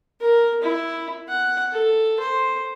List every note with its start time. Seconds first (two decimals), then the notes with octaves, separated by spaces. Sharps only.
0.20 A#4
0.62 E4
1.28 F#5
1.71 A4
2.20 C5